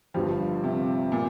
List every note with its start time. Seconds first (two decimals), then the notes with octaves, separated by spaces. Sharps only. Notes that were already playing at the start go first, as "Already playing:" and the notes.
0.14 G1 G2 F3 G3
0.64 C3
1.12 A#2